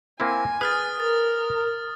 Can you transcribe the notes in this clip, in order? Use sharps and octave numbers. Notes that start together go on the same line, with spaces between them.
A#3 C4 E4 G#5
G#4 B4 D#6 F6 A6
A#4 A6